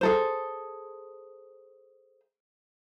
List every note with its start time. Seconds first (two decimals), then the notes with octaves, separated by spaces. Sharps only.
0.01 G#4 A4 C5